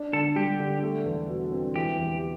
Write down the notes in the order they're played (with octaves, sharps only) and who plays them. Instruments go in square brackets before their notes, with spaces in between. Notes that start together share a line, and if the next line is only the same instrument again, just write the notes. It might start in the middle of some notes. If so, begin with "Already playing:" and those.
Already playing: [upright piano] D4
[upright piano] D3 [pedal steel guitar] A4
[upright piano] G3 [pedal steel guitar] G4
[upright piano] D3
A3
E2
B2
C4
[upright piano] E3 [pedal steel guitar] G4
[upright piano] E2